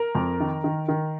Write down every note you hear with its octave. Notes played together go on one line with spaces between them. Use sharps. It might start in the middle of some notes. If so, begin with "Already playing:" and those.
Already playing: A#4
F2
D#3
D#3
D#3